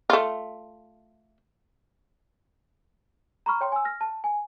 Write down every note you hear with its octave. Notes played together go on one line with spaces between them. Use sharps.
A3 F4
A#5 B5 C#6 F6
C#5 G5 C6
G#5 E6
F6 A#6
A5
G#5